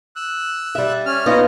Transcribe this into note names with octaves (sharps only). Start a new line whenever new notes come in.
E6 F#6
G3 E5
C#4 F6
B3 C#4 D#4 F4 D#5